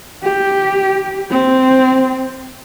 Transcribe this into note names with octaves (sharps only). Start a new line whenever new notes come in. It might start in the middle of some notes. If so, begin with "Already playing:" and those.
G4
C4